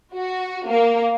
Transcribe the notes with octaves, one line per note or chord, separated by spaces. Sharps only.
F#4
A#3